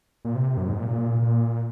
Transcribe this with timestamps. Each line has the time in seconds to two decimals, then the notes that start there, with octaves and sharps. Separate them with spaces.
0.25 A#2
0.35 C3
0.57 F#2
0.68 G#2
0.79 A#2
1.22 A#2